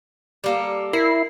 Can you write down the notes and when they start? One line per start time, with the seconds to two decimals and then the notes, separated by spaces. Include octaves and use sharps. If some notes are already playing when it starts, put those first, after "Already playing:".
0.44 G3 A#3 A4
0.93 E4 A#4 A#5 C7